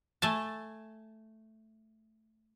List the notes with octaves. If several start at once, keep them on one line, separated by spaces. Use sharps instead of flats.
A3 G#5 A5